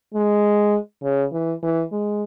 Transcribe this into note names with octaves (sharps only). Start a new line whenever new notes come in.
G#3
C#3
E3
E3
G#3